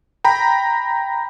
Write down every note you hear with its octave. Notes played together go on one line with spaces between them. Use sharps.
G5 A#5 B5